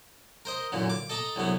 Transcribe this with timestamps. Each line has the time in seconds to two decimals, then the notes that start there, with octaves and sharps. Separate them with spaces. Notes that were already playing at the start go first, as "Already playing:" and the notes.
0.45 A#4 C5 D#5
0.72 F#2 A#2 D3 E3
0.89 D6
1.10 A4 D#5 A5 A#5
1.36 C2 D3 F#3 B3